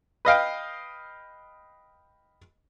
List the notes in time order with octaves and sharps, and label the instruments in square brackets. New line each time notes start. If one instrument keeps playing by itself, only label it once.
[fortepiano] B4 D#5 F5 G5